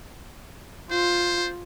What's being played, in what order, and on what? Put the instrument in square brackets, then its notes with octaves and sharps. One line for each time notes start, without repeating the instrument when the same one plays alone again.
[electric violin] F4 [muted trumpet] C5